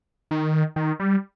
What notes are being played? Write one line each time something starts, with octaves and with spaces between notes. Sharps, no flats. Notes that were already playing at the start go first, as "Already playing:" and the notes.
D#3
D#3
G3